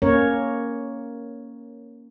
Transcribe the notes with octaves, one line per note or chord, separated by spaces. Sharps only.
A#3 C#4 A#4 C#5